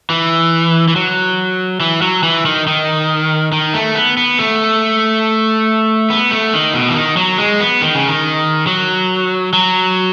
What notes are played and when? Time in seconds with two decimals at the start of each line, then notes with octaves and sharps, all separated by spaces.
0.10 E3
0.88 E3
0.96 F#3
1.80 E3
2.02 F#3
2.23 E3
2.45 D#3
2.67 D#3
3.52 D#3
3.74 A3
3.95 B3
4.17 B3
4.39 A3
6.10 B3
6.31 A3
6.53 D#3
6.74 B2
6.90 E3
6.96 D#3
7.17 F#3
7.38 G#3
7.60 B3
7.82 D#3
7.95 C#3
8.08 D#3
8.67 F#3
9.53 F#3